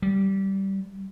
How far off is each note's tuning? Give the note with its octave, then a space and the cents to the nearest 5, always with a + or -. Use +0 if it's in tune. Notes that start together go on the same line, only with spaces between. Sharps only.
G3 -15